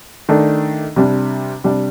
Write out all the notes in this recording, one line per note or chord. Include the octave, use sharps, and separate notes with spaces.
D#3 A3 D4
C3 G3 D4
C3 G3 D4